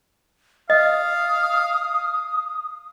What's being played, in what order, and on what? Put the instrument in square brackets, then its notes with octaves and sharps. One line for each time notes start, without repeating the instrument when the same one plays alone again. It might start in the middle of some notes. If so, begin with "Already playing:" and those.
[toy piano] D#5 [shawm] F5 [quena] D#6